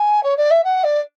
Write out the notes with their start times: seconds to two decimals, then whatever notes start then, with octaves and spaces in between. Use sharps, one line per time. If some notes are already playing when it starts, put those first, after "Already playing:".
Already playing: G#5
0.23 C#5
0.37 D5
0.50 E5
0.63 F#5
0.83 D5